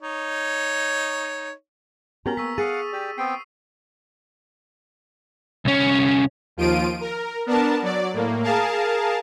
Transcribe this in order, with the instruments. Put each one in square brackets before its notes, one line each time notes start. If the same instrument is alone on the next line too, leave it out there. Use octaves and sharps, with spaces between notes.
[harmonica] D#4 C#5
[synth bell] B3 A#4 G#5 [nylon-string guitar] C#4 F#4 G4 [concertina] A#5
[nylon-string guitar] A#3 [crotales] C#6 E6 B6
[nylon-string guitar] G#4 [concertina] F5 F#5 [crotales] D#6 D#7 [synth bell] A6
[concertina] G4 D5
[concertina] B3 C4 G5 [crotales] C7
[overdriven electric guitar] C2 C#4
[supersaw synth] D#2 F3 F4 D7 D#7
A#4
B3 D4 A#4 A5
F#3 D5
A2 A#3
G#4 A#4 F5 A5